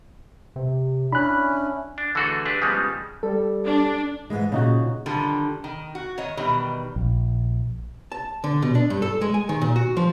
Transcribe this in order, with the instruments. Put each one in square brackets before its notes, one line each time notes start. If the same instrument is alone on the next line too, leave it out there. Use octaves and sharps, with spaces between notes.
[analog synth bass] C3
[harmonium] C#4 E4 [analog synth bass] D4 [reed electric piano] B5 F#6
[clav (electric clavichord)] D4
D3 E3 A3 F#4 G#4 A4
D4 G4 G#4 B4
C#3 F3 G3 G#3 B3 D#4
[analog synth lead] G3 [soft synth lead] A4
[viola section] D4
[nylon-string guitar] G#2 E3 G#3
[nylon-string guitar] A#2 [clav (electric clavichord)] C#3 D#4 F#4
[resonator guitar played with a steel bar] D3 D#3 F3 G3
D#3
F#4
D#3 C#5 D#5
B2 D#3 E3 G3
[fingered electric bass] A#1
[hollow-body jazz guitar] A5
D3
B2
D4
G2
A4
G#3
G#5
D#3
A#2
F#4
F3